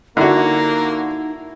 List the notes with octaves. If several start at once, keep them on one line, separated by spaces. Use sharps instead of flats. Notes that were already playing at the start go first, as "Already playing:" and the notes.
D3 A#3 D#4 E4 F#4